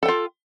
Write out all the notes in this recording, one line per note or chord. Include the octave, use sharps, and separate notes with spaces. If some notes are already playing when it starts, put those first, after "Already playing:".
F4 A4 G5